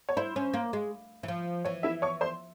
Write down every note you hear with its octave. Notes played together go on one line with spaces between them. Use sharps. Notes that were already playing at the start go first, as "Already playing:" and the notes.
C#5
E4 C5
C#4
A#3
G#3
E3
F3
E3 C#5
E4 E5
C#5 C#6
C5 C6